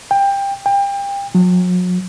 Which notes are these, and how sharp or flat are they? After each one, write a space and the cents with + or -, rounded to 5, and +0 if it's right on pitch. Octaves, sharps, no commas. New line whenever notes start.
G5 +20
G5 +30
F#3 -40